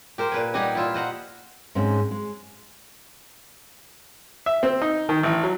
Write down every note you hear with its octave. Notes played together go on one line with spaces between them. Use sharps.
G4 A#4 C5
A#2 B4 G#5
G3 D#4 G4 D#5 F#5 G#5
E4 F4 E5
C5 D#5 F#5 A#5
G#2 G#3 C4 C#4
G#3
E5
C4
D#4
D#3
A1
F#3